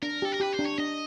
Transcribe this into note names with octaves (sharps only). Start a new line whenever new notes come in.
D4 A#4
G4 A4
A#4
G4 B4
C5
D4
C#5
D4 D#5